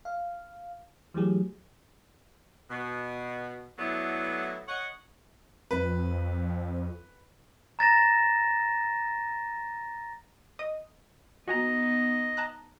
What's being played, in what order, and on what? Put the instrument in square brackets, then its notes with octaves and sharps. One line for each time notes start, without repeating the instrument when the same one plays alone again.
[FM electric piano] F5
E3 F#3 A3 G4 G#4
[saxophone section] B2
A2 F#3 B3 D4 E4 A4
C#5 D#5 F#5
[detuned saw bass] F2 [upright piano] B4
[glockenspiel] A#5 A6 A#6 E7
[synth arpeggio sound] D#5 D#6
[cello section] B3 D#4 [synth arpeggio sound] F#4 G#5 A#5 [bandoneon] D#5
[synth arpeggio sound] A5 A#5 F#6